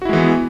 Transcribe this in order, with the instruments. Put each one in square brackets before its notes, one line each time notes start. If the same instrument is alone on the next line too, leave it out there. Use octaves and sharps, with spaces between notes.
[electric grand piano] F#4
E4
G#3
E3
B3